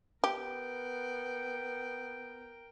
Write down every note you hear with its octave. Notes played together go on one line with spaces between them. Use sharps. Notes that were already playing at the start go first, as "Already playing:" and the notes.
B3 G4 A#4 G5